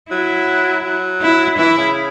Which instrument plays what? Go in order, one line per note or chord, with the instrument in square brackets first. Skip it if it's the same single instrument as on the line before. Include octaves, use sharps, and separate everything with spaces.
[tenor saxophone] F#3 [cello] E4
[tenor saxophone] F#3
[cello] E4
[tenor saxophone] E3 [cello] E4
[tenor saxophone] C#3